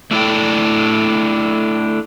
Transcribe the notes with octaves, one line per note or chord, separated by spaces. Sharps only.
A3 D4 E4 A4 D5 G5